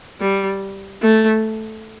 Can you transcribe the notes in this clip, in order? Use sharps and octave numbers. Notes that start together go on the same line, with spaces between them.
G3
A3